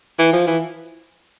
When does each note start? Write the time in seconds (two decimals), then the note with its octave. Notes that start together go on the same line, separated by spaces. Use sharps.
0.19 E3
0.33 F3
0.47 E3